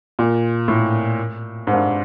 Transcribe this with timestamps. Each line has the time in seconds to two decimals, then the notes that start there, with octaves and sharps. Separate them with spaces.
0.19 A#2
0.68 A2
1.67 G#2
1.73 G2